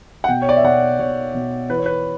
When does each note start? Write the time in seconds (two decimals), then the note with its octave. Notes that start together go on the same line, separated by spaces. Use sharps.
0.24 F#5
0.28 B2 G5
0.42 C#5
0.49 D5
0.57 E5
0.64 B2 F#5
0.99 B2 C#5
1.34 B2
1.70 E3 B4
1.78 C#5
1.86 B4